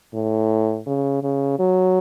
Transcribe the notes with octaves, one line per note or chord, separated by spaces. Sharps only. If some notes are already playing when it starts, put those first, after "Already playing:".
A2
C#3
C#3
F#3